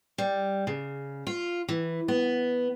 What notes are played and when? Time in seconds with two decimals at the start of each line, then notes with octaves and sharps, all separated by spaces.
0.18 G3
0.67 C#3
1.27 F4
1.68 E3
2.08 B3